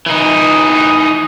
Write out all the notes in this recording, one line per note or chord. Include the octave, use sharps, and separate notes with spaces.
E3 D#4